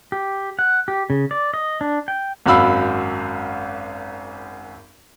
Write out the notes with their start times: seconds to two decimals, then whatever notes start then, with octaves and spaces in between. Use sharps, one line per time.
0.12 G4
0.59 F#5
0.88 G4
1.10 C#3
1.31 D5
1.54 D#5
1.81 D4
2.08 G5
2.46 G#1 F#2 F#4 F5 B5 E6